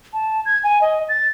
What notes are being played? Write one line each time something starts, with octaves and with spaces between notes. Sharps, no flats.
A5
G#6
G#5
D#5
A6